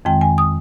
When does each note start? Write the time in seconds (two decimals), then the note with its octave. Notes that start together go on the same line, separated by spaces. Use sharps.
0.05 F2 D#3 G#3 C4 G5
0.21 G#5
0.38 D#6